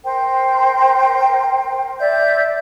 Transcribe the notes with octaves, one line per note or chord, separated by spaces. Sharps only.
A#4 C5 G5
D5 E5 G6